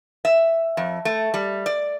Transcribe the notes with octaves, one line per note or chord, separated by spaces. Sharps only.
E5
F2
A3
G3
D5